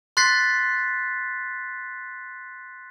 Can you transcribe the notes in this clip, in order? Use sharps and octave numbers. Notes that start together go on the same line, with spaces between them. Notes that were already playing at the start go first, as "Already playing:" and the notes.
C6 F#6 A6 B6 C7